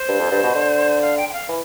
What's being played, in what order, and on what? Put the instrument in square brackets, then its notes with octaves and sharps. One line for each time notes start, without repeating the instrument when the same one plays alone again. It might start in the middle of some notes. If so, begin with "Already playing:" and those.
Already playing: [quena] C5
[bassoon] G2
F2
G2
B2
D3
[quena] F5
G5
G5
F5
[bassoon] E3